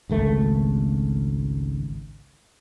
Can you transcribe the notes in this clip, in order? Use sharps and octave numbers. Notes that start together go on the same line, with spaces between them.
G#1 C#2 A3